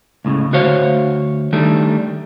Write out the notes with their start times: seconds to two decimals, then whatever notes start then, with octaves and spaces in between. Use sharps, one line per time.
0.25 C#2 A2 C#3
0.53 D2 F#4 C5 C#5 F5
1.53 D#3 G3 A3 D4